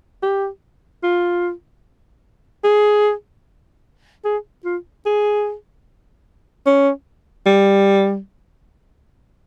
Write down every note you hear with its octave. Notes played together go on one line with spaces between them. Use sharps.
G4
F4
G#4
G#4
F4
G#4
C#4
G3